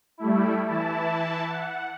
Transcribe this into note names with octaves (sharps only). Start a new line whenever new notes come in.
G3 A3 E4
E3 E4 A5
F#5